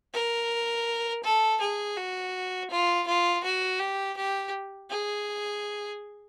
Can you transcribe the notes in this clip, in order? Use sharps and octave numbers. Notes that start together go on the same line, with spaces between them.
A#4
A4
G#4
F#4
F4
F4
F#4
G4
G4
G#4